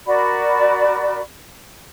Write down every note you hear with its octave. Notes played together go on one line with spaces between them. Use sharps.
F#4 A#4 D5 B5